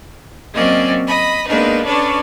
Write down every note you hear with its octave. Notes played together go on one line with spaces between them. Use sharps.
F#3 A#3 C4 C#4 D5 D#5
D#5 B5
G#3 A#3 B3 D4 D#4 B4
C#4 D4 A4 B4 C#5 D5